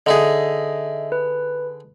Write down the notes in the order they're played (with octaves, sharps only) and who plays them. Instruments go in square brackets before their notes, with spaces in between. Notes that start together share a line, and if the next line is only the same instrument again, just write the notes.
[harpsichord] D3 D#4 G#4 [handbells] D#5 E5
[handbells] B4